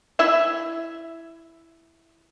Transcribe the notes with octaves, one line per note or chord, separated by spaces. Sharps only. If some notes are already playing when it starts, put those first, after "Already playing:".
E4 E5